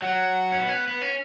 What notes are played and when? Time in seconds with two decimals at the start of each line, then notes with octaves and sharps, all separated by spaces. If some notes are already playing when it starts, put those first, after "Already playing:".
0.02 F#3 F#5
0.52 C#4
0.60 B3
0.68 C#4
0.73 B3
0.88 B3
1.01 C#4